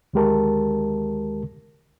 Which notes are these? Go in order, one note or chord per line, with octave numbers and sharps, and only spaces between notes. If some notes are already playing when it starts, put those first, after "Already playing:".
D2 D#3 G#3 G4 A#4 A5